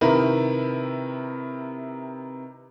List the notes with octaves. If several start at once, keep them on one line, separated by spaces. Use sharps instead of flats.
C3 D#3 E4 A#4 B4